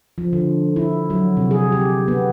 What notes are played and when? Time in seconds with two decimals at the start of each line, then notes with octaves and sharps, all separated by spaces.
0.18 F3
0.33 D3
0.76 E4
1.10 F#3
1.37 C3
1.51 G#4
1.72 G4
2.08 B3